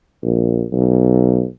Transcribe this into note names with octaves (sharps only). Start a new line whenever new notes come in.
A#1
B1